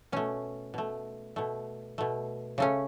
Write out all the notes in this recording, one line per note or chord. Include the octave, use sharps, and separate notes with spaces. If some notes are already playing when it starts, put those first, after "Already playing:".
B2 A3 C#4
B2 A3
B2 A3
B2 A3
C#3 A3 C#4